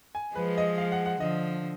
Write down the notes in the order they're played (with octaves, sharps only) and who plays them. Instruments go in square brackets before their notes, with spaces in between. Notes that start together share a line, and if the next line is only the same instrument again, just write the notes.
[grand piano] G#5
[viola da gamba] F3 G#3 [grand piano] B4
[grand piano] D#5
F5
F#5
F#5
[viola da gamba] D3 F3 [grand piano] D#5